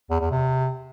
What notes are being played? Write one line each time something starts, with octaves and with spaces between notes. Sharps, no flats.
E2
E2
C3